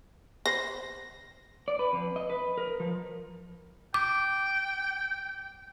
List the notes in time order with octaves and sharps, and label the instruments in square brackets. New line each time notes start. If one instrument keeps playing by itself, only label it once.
[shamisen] B4 C5 B5 [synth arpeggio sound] A#6
[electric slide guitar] D5
B4
F2
D#5
B4
A#4
F3
[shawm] G5 [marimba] D6